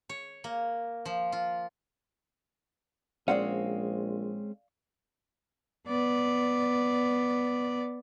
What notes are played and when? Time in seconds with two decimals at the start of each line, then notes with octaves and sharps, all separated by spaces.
0.09 C#5
0.44 A#3
1.05 F3
1.32 F4
3.28 A#1 G#3 C4 C#4 D5 F5 F#5
5.88 B3 D5